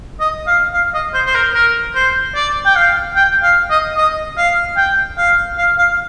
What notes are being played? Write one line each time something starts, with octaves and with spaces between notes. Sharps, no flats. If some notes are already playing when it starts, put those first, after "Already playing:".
D#5
F5
F5
D#5
C5
C5
A#4
A#4
C5
D5
G5
F5
G5
F5
D#5
D#5
F5
G5
F5
F5
F5